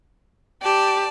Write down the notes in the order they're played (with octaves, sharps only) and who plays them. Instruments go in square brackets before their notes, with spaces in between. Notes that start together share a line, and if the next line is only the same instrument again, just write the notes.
[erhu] G4 [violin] D5 A5